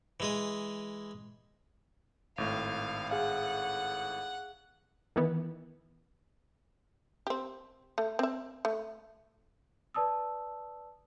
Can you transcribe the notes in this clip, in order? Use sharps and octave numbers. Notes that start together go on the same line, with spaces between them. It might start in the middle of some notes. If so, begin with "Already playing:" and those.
E3 G#3 D#6
G#1 A2 F5
G#4 F5 F#5
D#3 E3 B3
C4 G4
A3
C4 E5
A3
B4 D5 A5 D#6 E6